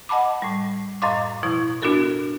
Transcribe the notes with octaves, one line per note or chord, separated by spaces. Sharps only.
D#5 F#5 A5 B5 D6
A2 G3
F#2 A2 D#5 F5 C6 D6
B2 F3 E4 C#6
B3 D4 F4 F#4 A4 A#4